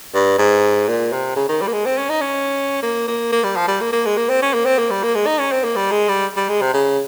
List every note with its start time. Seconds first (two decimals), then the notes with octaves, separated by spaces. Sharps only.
0.14 G2
0.38 G#2
0.88 A#2
1.12 C3
1.36 C#3
1.49 D#3
1.62 G3
1.68 A#3
1.73 G#3
1.86 C4
1.98 C#4
2.10 D#4
2.21 C#4
2.83 A#3
3.07 A#3
3.32 A#3
3.44 G3
3.56 F3
3.68 G3
3.81 A#3
3.92 A#3
4.06 G#3
4.17 A#3
4.30 C4
4.42 C#4
4.54 A#3
4.66 C4
4.78 A#3
4.90 G3
5.03 A#3
5.15 G#3
5.27 D#4
5.39 C#4
5.52 C4
5.64 A#3
5.76 G3
5.92 G#3
6.09 G3
6.37 G3
6.49 G#3
6.62 C3
6.74 C#3